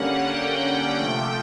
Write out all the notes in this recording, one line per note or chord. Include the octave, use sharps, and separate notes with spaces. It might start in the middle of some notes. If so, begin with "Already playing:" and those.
Already playing: D3 G3 A#3 C#4 F#5
G5
G5
C3 F3 A3 G5